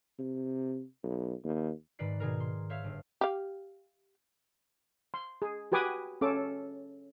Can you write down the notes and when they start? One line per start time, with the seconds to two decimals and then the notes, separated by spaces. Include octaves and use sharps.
0.19 C3
1.04 B1
1.45 D#2
1.99 G#2 D#3 B4 D5 C7
2.20 B2 D#3 G#4 A#4
2.40 C6
2.69 C5 C#5 E5 F5
2.84 G1
3.21 G4 F5
5.14 C6
5.42 G#4
5.72 F#4 G4 B4 G#5 D6 D#6
6.21 C#4 A4 D6